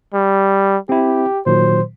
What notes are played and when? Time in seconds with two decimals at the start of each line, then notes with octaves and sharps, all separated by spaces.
0.14 G3
0.89 C4 E4 G4
1.46 A#2 D#3 F#3 C5